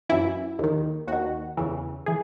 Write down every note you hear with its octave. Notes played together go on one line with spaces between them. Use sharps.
F#2 E3 E4
D#2 D#3
D#2 D#3 F#4
E2 C#3 E3
E3 G#4